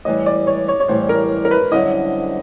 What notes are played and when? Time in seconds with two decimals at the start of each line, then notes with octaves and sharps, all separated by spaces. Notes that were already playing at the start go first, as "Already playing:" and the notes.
0.05 A2 E3 G3 D#5
0.26 D5
0.47 C#5
0.68 C#5
0.80 C#5
0.88 A2 E3 G3 C5
1.09 A#4
1.45 A#4
1.51 B4
1.71 F#2 D3 G3 C4 E4 D#5